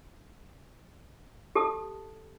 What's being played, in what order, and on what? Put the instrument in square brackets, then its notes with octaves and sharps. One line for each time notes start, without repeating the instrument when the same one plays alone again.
[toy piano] G4 A4 A5 D#6